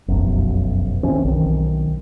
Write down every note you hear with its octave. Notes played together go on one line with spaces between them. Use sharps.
F1 B1 F#2
E3 C4 C#4
B1 D#3